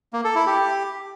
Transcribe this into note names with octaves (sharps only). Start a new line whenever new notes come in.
A#3
A4
E4
G4